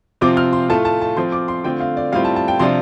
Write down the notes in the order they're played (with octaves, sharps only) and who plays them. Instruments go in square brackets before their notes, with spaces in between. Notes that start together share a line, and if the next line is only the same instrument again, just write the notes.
[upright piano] C3 F3 C4 F4 D6
F6
C6
A2 A3 F4 A5
A5
A5
F3 C4 F4 C6
D6
C6
D3 A3 C4 F4 G5
F5
D5
A2 G3 C4 F4 F5
A5
A5
G5
C3 F3 D4 F4 C6